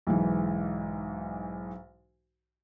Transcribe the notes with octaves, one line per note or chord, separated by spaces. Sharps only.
B1 G#2 E3